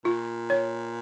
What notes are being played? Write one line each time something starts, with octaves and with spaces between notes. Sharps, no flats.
A#2 F4
C#5